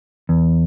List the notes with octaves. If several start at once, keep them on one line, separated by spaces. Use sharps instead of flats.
E2